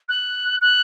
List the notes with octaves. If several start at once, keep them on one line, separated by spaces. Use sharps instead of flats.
F#6
F#6